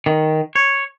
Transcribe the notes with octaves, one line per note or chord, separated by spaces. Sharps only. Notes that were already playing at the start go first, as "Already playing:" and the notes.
D#3
C#5